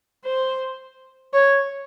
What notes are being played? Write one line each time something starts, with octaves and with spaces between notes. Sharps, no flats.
C5
C#5